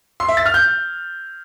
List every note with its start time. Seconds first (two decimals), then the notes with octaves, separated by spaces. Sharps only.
0.20 C6
0.28 E5
0.37 A6
0.46 F6
0.54 G6